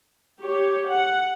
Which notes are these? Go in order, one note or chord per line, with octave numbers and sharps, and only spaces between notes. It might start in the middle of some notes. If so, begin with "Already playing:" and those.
G4 C#5
F#5